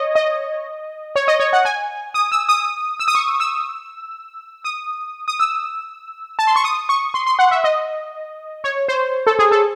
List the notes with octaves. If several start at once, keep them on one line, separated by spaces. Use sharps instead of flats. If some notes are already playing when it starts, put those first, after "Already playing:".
Already playing: C#5 D#5
D#5
C#5
D#5
C#5
F#5
G#5
D#6
E6
D#6
E6
D#6
C#6
E6
D#6
D#6
E6
A5
C6
C#6
D#6
C#6
C6
C6
F#5
E5
D#5
C#5
C5
A4
G#4
A4